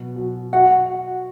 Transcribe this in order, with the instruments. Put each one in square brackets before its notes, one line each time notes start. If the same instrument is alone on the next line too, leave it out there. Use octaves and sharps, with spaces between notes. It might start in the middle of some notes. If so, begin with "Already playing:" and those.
Already playing: [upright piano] B2 F#3
F#3
[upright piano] F#4 [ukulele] F#5